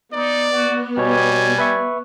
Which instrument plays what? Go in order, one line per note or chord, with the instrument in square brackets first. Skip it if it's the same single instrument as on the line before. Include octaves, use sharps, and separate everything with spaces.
[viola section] B3 [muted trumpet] D#4 [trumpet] D5
[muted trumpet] F#4
[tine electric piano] B2 C#5 [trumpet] G3 [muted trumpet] G#5
[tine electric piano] B4 E5 C#6